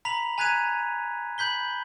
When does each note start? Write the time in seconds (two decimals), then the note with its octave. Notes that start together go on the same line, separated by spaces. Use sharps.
0.05 A#5 B5 B6 F7
0.38 G#5 A#5 F#6 G#6 B6 D#7
1.38 B5 G6 B6 G7